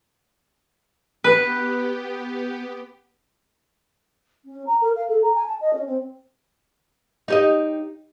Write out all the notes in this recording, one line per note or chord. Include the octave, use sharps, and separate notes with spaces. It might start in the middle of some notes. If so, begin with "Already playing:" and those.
B3 G4 B4
C#4
A#5
A#4
F5
A4
A#5
G#5
A5
D#5
C#4
C4
D#4 G4 D#5